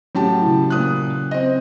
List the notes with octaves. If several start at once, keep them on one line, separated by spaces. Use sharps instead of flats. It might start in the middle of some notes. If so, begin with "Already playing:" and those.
A2 F#3 C#4 F#4 G4 A5
C#3 E4
A#2 D#6 F#6
C4 D#5